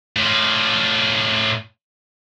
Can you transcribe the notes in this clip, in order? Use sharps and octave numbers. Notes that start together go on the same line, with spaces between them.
A2 F4